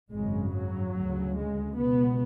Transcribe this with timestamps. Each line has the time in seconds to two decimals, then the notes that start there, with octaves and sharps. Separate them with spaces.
0.11 G#1 F#2 C#3 G#3
0.53 F#3
0.94 D2 C#3
1.35 G#3
1.76 C#2 B2 B3